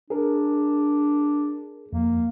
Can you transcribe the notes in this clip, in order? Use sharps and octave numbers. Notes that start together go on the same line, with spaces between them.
D4 G#4 A#4
F2 A#3